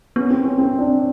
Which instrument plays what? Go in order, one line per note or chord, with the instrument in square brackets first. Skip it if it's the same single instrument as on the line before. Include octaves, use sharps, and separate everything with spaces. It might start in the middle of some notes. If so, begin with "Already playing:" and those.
[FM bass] B3 [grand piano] C#4
[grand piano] C4
C#4
C4
D4